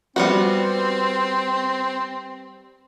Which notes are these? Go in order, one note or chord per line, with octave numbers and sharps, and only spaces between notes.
G3 B3 C4 F#4